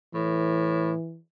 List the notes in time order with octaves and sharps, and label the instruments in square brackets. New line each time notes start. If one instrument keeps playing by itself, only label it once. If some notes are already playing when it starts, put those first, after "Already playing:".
[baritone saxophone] A2 [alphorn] E3